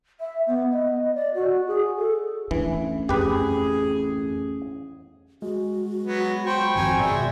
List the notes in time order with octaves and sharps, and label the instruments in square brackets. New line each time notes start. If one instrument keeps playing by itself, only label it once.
[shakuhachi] E5
B3
D#5
D5
F#4
G#4
A4
[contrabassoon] A1 [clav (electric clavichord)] E3 [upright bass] D4
[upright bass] F2 [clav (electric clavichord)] G4 B4 [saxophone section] G#4
[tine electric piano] G#3 [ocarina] F#4
[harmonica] F#3 B3
[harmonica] C5 B5 [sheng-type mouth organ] G5 C#6
[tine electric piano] G#1 F2 A#5 [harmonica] G#5
[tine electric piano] B2 [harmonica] G#3 E5 [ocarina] D5